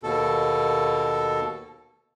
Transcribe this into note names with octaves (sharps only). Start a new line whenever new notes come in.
D#2 B2 A4